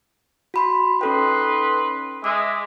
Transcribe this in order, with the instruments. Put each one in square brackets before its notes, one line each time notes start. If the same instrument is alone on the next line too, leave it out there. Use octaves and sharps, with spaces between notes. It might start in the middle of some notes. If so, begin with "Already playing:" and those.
[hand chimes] F#4 B5 C6
[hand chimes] C#4 A4 G5 [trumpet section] D#4 B4 C6
[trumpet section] G#3 E5 [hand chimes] D6